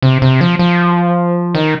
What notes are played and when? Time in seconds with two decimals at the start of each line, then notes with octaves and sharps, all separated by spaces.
0.02 C3
0.22 C3
0.41 F3
0.59 F3
1.55 D#3